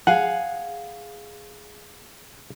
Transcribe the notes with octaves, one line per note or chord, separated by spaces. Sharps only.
G#4 F5 F#5 G#5